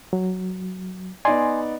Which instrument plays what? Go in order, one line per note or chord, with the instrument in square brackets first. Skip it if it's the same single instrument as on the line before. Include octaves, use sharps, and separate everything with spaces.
[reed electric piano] F#3
[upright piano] B3 D#4 D5 [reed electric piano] G#5 C6